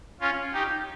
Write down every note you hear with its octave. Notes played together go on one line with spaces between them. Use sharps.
C#4 F4
D#4 G4